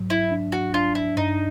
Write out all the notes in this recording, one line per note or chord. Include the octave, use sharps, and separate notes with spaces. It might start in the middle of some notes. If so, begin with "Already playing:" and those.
Already playing: G#2 F#3
E4
D4
F#4
D4 F4
E4
G2 D#4